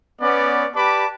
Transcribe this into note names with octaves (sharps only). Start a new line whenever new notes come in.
B3 C#4 D5
G4 B4 D5 A5 B5 D6